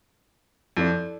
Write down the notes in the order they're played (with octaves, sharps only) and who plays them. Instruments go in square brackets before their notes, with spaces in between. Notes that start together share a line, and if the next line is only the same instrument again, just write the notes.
[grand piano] F2 [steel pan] E4 A4 D5